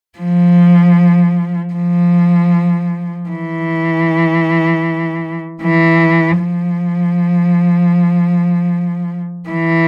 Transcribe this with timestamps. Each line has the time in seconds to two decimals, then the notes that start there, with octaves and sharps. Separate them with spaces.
0.19 F3
1.73 F3
3.29 E3
5.62 E3
6.38 F3
9.49 E3